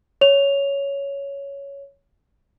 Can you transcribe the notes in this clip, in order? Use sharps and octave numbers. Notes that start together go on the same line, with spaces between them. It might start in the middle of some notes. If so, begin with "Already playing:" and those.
C#5 F7